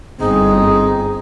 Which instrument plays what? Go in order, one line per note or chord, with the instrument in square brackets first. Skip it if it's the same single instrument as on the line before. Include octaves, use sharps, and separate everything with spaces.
[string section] G1 [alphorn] C4 [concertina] D#4 [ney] G#4